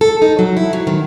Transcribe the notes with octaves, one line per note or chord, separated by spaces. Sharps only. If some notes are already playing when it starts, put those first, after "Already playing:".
A4
D#4
F#3
E4
F#3
D#3